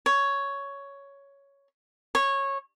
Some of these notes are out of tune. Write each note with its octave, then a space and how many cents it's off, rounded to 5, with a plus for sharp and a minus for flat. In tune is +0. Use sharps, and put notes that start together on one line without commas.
C#5 +5
C#5 -15